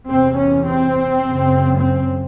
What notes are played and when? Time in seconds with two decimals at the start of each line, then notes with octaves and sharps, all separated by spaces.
0.09 E2 C3 C4
0.38 C#4
0.67 C4
1.23 F#2 C#3
1.80 C4